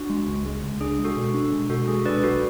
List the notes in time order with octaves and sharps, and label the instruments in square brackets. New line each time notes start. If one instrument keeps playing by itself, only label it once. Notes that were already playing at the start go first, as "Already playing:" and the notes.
Already playing: [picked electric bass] D4 [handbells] F#4
[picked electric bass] G#3
C#2
G#3
C#2
[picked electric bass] D4 [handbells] G#4
[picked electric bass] G#3
[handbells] F#4 A4
[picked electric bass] B2
D4
G#3
[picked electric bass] B2 [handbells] F#4 A4
[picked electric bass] G#3 [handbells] G#4
[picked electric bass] D4 [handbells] B4 D5
[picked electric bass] B1 [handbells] F#4 A4